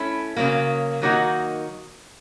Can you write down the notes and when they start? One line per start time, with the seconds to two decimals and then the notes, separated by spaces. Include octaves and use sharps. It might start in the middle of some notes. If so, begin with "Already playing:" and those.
Already playing: A3 C#4 E4
0.36 C#3 F#3 A#3
1.02 D#3 F#3 A#3 D#4 F#4